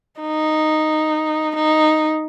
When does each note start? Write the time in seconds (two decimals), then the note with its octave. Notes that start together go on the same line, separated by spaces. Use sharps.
0.21 D#4
1.56 D#4